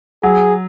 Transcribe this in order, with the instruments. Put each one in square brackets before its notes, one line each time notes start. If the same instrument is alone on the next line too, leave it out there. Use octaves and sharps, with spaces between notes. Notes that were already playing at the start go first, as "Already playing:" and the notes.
[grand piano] F#3 [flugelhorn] G#4